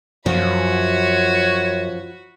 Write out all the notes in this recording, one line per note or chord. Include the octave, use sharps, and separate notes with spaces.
F#2 F3 F#4 C#5 B5